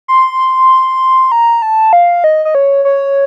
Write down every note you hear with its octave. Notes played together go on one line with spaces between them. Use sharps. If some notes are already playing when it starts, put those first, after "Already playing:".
C6
A#5
A5
F5
D#5
D#5
C#5
C#5